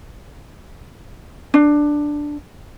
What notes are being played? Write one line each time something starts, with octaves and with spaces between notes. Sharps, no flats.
D4